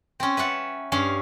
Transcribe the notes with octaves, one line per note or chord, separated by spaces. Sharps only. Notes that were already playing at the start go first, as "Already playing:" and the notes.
C4 C#4
B4 E5 F#5 A5
G2 C#4 F5